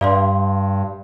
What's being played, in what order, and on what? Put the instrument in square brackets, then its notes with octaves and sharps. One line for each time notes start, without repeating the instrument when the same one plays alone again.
[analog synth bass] G2 [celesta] D5 F5 C6